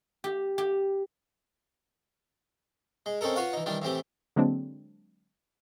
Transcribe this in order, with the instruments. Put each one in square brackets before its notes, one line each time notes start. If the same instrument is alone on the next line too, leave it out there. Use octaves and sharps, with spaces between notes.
[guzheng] G4
G4
[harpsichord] G#3
C4 C#4 D#4 A4 A#4
F4 F#4 B4 C#5 F5
E3 D#4
D#3 E3 G3 D4
A2 E3 C4 G4
[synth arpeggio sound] D3 F#3 G#3 A#3 C4 D4